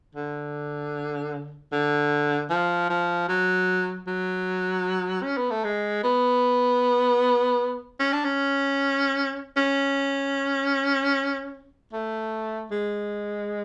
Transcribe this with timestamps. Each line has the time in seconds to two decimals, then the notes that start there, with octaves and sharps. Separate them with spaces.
0.15 D3
1.72 D3
2.50 F3
2.90 F3
3.29 F#3
4.07 F#3
5.23 C#4
5.38 B3
5.50 A3
5.65 G#3
6.04 B3
8.00 C#4
8.13 D4
8.24 C#4
9.57 C#4
11.93 A3
12.71 G#3